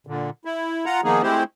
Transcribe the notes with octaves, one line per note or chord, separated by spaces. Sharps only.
A#2 D3
E4
F4 F#5 A#5
D#3 F3 A#3 B3 D#4 G#4
G#3 A3 C4 E4 G4 C5